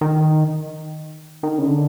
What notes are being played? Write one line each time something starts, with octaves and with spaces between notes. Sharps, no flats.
D#3
D#3
C#3
D3